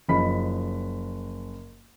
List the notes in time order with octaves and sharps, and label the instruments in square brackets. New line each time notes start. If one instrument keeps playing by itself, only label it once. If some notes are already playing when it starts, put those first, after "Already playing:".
[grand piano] F#1 F3 D#5 B5 B6